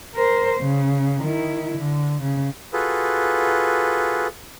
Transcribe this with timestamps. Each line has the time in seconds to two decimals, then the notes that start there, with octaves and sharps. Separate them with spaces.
0.15 A#4 C5
0.61 C#3
1.23 D#3 E4
1.78 D3
2.22 C#3
2.73 F4 F#4 G#4 A4 B4